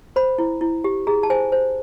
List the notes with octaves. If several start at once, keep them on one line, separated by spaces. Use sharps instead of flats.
C5 B5
E4
E4
G4
G#4 A#5
A5
C5 G#5
C5